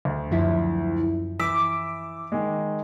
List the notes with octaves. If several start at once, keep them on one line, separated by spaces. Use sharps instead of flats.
D2
F#2 F3 E4
E3 D6 E6 B6
D#3 G#3